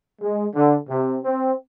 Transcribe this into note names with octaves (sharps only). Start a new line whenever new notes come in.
G#3
D3
C3
C4